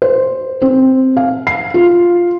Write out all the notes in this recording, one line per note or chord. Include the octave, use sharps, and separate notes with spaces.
C5
C4
F5
C7
F4